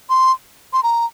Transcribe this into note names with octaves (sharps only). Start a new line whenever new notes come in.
C6
C6
A#5